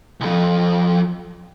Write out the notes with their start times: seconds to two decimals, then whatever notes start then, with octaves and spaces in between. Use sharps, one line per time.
0.21 C2 F2